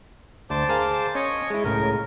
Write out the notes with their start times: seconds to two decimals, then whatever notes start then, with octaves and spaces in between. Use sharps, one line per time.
0.50 D2 C5 A5 D6
0.69 G#4 A#4 F5
1.15 C#4 C#5 D#5 C#6
1.50 G#3 E4
1.64 C#2 A2 C#3 A#4